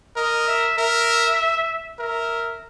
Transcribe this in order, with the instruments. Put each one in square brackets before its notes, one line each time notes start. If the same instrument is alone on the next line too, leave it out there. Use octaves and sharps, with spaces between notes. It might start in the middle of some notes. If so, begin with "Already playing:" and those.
[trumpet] A#4 [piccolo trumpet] D#5
[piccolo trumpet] E5
[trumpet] A#4 [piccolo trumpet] E5
[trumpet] A#4 [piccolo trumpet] E5